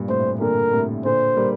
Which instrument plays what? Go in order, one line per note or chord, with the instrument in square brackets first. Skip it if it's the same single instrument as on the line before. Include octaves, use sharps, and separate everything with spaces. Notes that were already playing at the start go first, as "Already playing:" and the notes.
Already playing: [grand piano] G2 A#2
[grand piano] A2 C3 [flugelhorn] C5
[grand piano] A#2 D3 [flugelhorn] A#4
[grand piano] A2 C3
[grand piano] A#2 D3 [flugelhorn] C5
[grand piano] G3 A#3